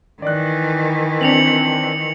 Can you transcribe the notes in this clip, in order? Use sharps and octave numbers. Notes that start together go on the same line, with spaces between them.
D#3 E3 D5 F#6
C4 D4 C#7 F7 F#7